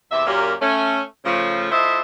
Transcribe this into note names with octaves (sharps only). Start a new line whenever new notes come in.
E2 C3 G4 E5
F#2 A#2 A#3 C#4 G4 A#4
A3 C#4
C#3 F3 A3
A3 E4 F4 C5 D#5 E5